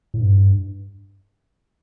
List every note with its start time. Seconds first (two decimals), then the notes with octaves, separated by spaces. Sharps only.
0.14 A2
0.21 G2